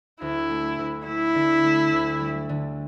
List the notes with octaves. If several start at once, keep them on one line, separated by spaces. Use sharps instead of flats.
D2 E4
A3
D2
A3 E4
D3
A3
D2
G3
D3